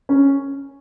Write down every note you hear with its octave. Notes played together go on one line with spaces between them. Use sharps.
C#4